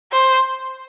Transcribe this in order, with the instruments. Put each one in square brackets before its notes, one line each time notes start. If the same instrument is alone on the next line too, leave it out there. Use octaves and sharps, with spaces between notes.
[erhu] C5